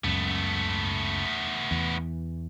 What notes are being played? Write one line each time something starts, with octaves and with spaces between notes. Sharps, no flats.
F#1 C#2 F#2 A3 B3
E2 E3